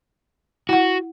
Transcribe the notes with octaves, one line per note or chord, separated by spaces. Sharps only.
E4 F#4 F#5